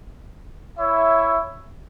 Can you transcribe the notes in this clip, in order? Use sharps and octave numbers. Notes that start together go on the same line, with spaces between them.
E4 C#5 E5